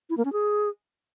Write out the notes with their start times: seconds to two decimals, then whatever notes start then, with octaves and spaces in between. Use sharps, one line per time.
0.10 E4
0.17 A#3
0.25 C#4
0.33 G#4